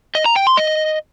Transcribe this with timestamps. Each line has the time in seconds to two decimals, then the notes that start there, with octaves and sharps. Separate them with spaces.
0.15 D#5
0.26 A#5
0.36 G5
0.47 C6
0.57 D#5